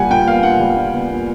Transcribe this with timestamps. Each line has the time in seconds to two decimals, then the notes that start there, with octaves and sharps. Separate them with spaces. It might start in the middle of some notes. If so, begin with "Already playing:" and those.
Already playing: A#2 G3 F#5 G#5
0.10 A#2 G5
0.27 B3 F5
0.43 A#2 F#5
0.60 G3
0.77 A#2
0.94 B3
1.11 A#2